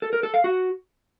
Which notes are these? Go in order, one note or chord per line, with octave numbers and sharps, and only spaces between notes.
A4
A#4
A4
F5
F#4